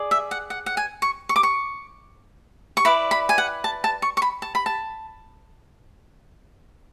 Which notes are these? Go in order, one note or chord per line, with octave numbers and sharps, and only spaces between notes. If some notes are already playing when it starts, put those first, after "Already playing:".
Already playing: G#4 D5
E5
F#5
F#5
F#5
G#5
C#6
C#6
D6
C#6
C#6
E4 B4 D5 B5
B5
G#5
F#5
A5
A5
C#6
C#6
B5
A5
B5
A5